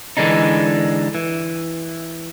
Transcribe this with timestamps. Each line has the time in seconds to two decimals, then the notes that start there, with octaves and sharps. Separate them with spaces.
0.17 D3 E3 G#3 D4 D#4
1.15 E3